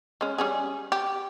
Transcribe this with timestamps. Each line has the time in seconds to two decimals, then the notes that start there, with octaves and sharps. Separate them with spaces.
0.21 G#3 C#4
0.38 G3 C#4 G#4
0.92 G4